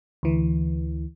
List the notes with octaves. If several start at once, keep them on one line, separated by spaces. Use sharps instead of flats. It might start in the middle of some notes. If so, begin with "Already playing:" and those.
D2 E3